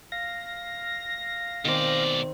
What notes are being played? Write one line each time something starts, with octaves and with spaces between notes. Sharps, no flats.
F5 A#6
B2 D#3 C4 D5